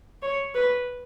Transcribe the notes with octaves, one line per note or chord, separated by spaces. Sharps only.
C#5
B4